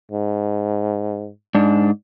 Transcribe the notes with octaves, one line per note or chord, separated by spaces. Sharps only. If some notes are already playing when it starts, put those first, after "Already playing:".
G#2
G#2 D4